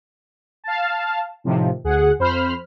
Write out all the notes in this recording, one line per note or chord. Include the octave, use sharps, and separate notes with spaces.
F5 A5
A2 C3 D#3 F3
D2 G#4 F#5
F2 C5 B5 F6